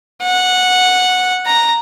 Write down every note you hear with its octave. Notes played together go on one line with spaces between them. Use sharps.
F#5
A#5